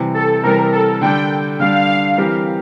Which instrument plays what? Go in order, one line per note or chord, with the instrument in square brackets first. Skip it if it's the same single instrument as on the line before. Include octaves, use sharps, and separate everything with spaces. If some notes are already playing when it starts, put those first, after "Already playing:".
Already playing: [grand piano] C3 E3 G3
[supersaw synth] A4
[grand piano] C3 E3 G3 [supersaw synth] A#4
[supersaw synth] A4
[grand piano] D3 G3 D4 [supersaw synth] G5
[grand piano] D3 G3 D4 [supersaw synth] F5
[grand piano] E3 G3 C4 G4 A#4